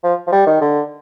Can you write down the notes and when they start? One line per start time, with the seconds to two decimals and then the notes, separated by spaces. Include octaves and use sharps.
0.04 F3
0.27 F3
0.32 G3
0.46 D#3
0.61 D3